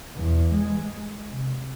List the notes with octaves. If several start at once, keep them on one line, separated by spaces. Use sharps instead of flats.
E2
G#3
C3